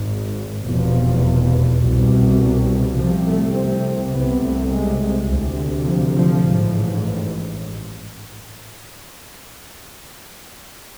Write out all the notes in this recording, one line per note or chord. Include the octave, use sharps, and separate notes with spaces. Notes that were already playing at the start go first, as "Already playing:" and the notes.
Already playing: G#1 G#2
F1 E2 B2 F3
C2 B2
C2 C3 F3
A3
C4
C2 C3 B3
A3
G#3
D2 C3
F3
F3
A1 G#2